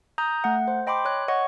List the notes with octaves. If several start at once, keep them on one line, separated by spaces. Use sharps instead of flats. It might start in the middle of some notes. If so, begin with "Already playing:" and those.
A#5 D#6 G6
A3 F#5
C5
D#5 G5 B5 C6 D6
C#5 F#6
C#5 D#5 F#5 C#6